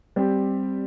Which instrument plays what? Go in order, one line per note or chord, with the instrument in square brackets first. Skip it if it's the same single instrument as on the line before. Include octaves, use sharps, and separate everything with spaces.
[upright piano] G3 C4 G4